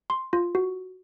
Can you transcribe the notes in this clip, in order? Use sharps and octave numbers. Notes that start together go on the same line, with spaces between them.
C6
F4
F#4